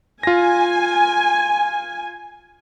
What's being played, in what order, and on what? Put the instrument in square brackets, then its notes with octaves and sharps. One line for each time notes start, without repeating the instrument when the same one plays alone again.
[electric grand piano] F4 A#6 [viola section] G#5